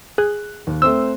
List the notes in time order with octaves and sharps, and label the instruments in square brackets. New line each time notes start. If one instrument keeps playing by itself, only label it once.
[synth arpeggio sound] G#4 [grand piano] F#6
[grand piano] D#2
[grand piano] A3 C4 C5 [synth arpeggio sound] E6